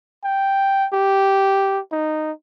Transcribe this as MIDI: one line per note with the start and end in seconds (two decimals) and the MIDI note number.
0.24 0.87 79
0.93 1.80 67
1.92 2.32 63